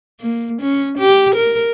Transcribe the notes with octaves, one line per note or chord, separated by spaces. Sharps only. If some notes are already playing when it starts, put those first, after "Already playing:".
A#3
C#4
G4
A#4